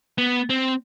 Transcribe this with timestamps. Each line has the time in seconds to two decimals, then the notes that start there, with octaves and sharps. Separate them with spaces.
0.18 B3
0.50 C4